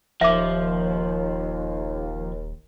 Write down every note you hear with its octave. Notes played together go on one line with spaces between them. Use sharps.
D#1 D#2 F3 E5 D6